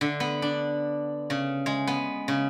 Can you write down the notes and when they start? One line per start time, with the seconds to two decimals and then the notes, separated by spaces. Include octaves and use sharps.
0.01 D3
0.20 B3
0.42 D4
1.30 C#3
1.66 G#3
1.87 B3
2.28 C#3